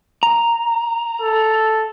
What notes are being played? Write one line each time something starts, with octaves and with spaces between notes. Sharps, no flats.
A#5
A4